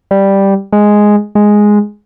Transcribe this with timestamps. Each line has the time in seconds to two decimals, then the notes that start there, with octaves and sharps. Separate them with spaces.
0.11 G3
0.73 G#3
1.35 G#3